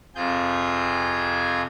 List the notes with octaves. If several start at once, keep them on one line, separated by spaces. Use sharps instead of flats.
F2 C3 F4 G#4 G#5 G6